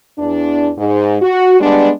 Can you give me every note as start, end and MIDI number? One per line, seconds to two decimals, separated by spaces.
0.18 0.70 40
0.18 0.70 62
0.78 1.16 44
1.21 1.57 66
1.60 1.91 55
1.60 1.91 56
1.60 1.91 59
1.60 1.91 62